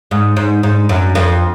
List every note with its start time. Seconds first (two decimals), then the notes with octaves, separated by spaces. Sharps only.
0.11 G#2
0.37 G#2
0.63 G#2
0.89 F#2
1.15 F2